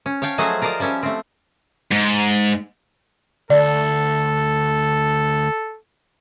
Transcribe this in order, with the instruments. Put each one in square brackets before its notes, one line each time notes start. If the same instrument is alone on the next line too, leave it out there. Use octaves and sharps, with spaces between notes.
[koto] C#4
C#5 F5 G5 A5
F3 F#3 A3 G#4 C5 D#5
F4 A#4 C5 D5 D#5 F5
F3 G3 C#4 E5 A5
A3 C4
[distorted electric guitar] G#2
[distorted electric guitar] D2 [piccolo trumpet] A4 [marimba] D5